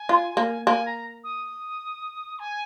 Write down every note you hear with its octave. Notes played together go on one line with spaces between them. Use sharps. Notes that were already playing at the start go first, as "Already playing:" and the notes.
Already playing: G#5
F4
A#3
A#3 G#5
A#5
D#6
G#5